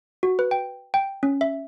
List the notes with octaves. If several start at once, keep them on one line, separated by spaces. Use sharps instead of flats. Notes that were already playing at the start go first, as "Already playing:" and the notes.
F#4
B4
G5
G5
C#4
E5